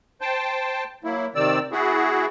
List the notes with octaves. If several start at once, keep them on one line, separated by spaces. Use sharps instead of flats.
C5 G5 A5
F#3 A#3 E4
C3 D#3 C4 D5 E6
B3 E4 F#4 G#4